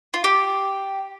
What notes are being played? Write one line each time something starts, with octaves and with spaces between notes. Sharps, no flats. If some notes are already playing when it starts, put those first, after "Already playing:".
F4
G4